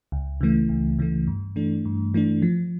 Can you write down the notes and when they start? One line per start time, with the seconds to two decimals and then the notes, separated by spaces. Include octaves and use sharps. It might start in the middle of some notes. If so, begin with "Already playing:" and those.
0.12 C#2
0.41 C#3 E3 A3
0.69 C#2
0.99 C#3 E3 A3
1.27 G2
1.56 E3 A3 D4
1.85 G2
2.14 E3 A3 D4
2.42 F3